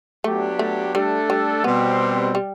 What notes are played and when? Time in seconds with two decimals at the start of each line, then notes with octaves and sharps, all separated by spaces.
0.24 F#3 A3 B3 D4 G4
0.59 A3
0.94 G3 A3 D4 A4
1.30 G3
1.64 B2 G3 B3 C4
2.35 G3